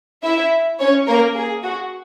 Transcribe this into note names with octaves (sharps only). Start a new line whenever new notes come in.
E4 E5
C#4 C#5
A#3 A#4
G#4
F#4